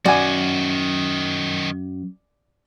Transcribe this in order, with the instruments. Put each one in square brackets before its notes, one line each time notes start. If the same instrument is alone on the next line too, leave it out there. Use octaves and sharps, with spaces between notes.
[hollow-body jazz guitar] F#2 [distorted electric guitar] D#3 F#4 [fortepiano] D5 G#5